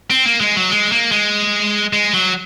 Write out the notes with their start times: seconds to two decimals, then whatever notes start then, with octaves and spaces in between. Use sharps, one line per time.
0.10 C4
0.26 A#3
0.41 G#3
0.56 F#3
0.71 G#3
0.92 A#3
1.12 G#3
1.93 G#3
2.14 F#3